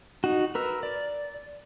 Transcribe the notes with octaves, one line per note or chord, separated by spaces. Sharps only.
D#4 F#4
A#4 B4 E6
D5